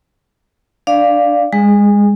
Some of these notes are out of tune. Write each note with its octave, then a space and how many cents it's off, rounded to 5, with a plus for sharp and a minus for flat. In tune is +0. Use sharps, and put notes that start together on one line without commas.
D4 +0 D5 +0 F5 +0
G#3 -25 G#4 +0